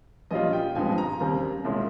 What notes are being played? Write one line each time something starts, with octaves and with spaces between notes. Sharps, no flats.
A#1 A#2 G3 C#4 F4 D#5
G5
G1 G2 F3 G#3 C4 G#5
A#5
D#2 C#3 G3 C4 A#5
C2 A#2 G#3 C#4